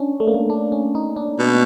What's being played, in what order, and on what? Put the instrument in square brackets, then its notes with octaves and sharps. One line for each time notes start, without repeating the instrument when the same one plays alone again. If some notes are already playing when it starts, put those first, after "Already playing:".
Already playing: [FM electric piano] C#4 D4
A3
A#3
A3
D4
C#4
D#4
D4
[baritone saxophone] B2